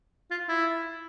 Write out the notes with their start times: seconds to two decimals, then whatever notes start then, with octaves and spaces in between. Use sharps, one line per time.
0.31 F4
0.49 E4